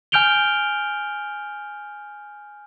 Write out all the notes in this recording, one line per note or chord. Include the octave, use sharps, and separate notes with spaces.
G#5 F6 G6 D7 F7 G7